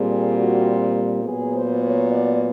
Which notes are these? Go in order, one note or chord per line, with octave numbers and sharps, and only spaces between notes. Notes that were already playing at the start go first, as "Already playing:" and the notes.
Already playing: A#2 G3 C4 G#4
F#4
A#2 F#3 B3 G#4
C5
C#5
D5